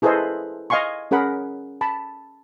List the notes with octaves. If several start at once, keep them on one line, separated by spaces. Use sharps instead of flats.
E4 G#4 A4 B4 C5 D#5
D#5 F5 G#5 C6 C#6
C#4 G#4 A#4 F#5 B5
A5 B5